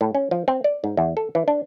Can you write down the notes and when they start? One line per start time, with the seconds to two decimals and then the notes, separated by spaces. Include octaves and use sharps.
0.01 A2
0.15 C#4
0.31 F3
0.48 C4
0.64 D5
0.84 G#2
0.97 E2
1.17 A4
1.35 E3
1.48 D4